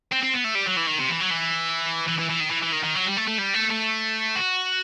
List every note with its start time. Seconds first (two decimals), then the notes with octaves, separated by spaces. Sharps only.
0.12 C4
0.23 C4
0.34 B3
0.44 A3
0.55 G3
0.66 F#3
0.77 E3
0.87 D#3
0.99 C3
1.10 E3
1.21 F#3
1.31 E3
2.08 E3
2.19 E3
2.30 E3
2.40 D#3
2.50 E3
2.63 E3
2.72 D#3
2.84 D#3
2.95 F#3
3.06 G3
3.17 A3
3.28 A3
3.39 G3
3.54 A3
3.71 A3
4.36 F#4